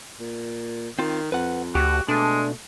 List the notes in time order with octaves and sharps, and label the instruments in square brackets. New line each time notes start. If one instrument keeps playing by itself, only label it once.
[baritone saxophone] A#2
[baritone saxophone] D#3 [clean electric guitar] C4 F4
[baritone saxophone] F2 [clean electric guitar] B4 F#5
[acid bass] D2 [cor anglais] F#4 [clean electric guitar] G4
[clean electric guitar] B2 [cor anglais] G#3 [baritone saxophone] A3 [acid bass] D4